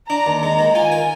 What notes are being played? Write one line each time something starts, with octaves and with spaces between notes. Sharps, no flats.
D4 A#5
D#2
G#3 A#5
D#3
F4 G#5
A#4